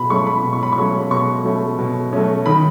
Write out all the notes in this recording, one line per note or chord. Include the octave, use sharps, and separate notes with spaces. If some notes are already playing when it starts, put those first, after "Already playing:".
Already playing: B2 B5
F#3 A3 C#4 C#6
B5
B2
C#6
B5
C#6
F#3 A3 C#4
B2 C#6
F#3 A3 C#4
B2
F#3 A3 C#4
D#3 B5